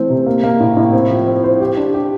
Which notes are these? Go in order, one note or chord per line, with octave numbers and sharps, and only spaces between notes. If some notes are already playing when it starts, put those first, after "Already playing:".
Already playing: E3 A3 C4
C3
A#3
A#3
A2
A2
C4
F3
C4
C5
G4
D4
G4